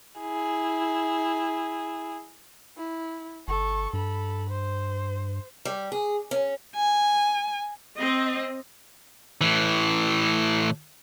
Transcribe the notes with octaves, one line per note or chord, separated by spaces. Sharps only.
E4 G#4
E4
G1 A4 C#6
G2 A4 B5
C5
G3
G#4
C#4
G#5
C4 D#5
A2 E3